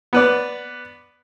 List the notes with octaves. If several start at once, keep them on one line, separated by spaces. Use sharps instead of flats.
B3 B4 D5